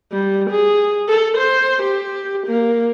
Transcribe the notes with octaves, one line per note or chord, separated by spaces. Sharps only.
G3
G#4
A4
C5
G4
A#3